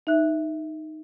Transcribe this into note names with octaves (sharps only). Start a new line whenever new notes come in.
D#4 E5 F#6